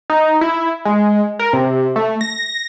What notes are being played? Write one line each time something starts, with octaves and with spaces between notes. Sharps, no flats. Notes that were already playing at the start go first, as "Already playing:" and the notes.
D#4
E4
G#3
A#4
C3
A3
A#6